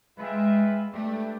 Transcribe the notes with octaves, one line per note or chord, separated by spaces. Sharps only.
G#3 F4 G#4 B4 E5 G5
A3 D4 G4 B4 D5 G5